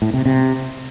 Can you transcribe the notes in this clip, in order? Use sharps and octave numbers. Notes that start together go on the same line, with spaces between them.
A2
C3
C3